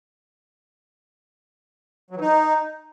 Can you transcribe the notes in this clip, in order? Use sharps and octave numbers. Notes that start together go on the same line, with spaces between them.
F#3
E3
D#4